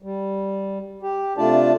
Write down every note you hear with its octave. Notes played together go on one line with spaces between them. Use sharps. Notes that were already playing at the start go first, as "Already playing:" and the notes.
G3
G4
C3 A3 D4 F4 D5 A5